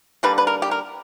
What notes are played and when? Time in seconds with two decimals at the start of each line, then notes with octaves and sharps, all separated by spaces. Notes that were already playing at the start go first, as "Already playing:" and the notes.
0.23 D3 G3 A#3 B4
0.38 B4
0.47 A#4
0.62 G4
0.71 A#4